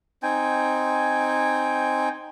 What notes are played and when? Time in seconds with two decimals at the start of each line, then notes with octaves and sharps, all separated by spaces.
0.23 C4 D#4 G5 G#5